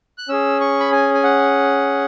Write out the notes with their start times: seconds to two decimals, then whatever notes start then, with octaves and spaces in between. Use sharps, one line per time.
0.18 F#6
0.29 C#4 G#4 E6
0.60 C#6
0.80 B5
0.92 G#5
1.14 G#5
1.23 F#5